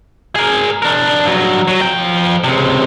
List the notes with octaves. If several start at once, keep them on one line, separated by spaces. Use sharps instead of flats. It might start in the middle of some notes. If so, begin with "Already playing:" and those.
G#4 A#4
D4 A#4
G2 F#3
F#3
F3 G5
C#2 C3